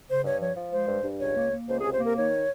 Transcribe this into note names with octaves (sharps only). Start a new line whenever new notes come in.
C#3 C5
G2 C#5
F3 C#5
F3
G#3 C5
G2
G2
C#2 C#5
A#3
A#3
C#2 C5
G#4
C3
C5
A#3 A#4
D#3 C#5